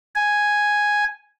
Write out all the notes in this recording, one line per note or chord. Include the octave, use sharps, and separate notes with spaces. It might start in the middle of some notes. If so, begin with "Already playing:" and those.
G#5